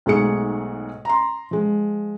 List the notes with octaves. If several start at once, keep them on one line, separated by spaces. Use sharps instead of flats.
B1 G#2 A3 G#4 C#7
A#5 C6
F3 G#3